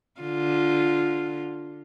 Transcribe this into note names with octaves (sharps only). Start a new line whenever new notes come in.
D3 F4